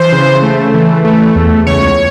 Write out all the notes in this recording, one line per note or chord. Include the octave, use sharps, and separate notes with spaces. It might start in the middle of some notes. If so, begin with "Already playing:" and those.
Already playing: E3 C5
C#3
A3
E3
A3
E2
C#2 C#5